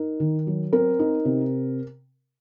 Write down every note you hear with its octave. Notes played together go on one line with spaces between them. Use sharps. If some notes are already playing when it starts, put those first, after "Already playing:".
Already playing: D#4 A#4
D#3
F#3
C4 A#4
D#4
C3